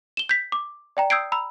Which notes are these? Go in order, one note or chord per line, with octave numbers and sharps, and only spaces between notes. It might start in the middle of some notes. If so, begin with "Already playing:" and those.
E7 G7
G6 B6
D6
D5 G5 A#5
D#6 E6 G6 G#6 C7 D7
A#5 B5 E6